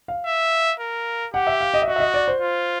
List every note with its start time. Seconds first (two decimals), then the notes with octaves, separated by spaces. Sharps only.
0.08 F5
0.26 E5
0.80 A#4
1.34 G4 F#5
1.47 E5
1.61 F5
1.74 D#5
1.82 E5
1.87 F#4 D#5
1.96 E5
2.00 D#5
2.14 D5
2.28 C5
2.41 F4